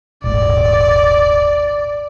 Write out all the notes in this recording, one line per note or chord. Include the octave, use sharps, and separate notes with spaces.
D#1 G#1 D5